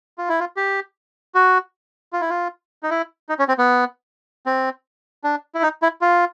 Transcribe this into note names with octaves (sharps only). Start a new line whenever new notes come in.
F4
E4
F4
G4
F#4
F4
E4
F4
D#4
E4
D#4
C#4
C4
B3
C4
D4
E4
D#4
E4
F4